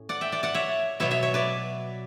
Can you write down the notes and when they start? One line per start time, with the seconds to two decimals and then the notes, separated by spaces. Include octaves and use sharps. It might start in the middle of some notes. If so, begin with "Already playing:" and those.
Already playing: A2 C#4
0.09 D5 F#5
0.21 E5 G5
0.32 D5 F#5
0.43 D5 F#5
0.54 C#5 E5
1.00 B2 F#3 B3 C#5 E5
1.11 C#5 E5
1.23 C#5 E5
1.34 B4 D5